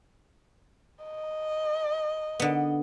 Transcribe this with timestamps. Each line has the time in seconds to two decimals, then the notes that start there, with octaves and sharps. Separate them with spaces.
1.04 D#5
2.40 D3 B3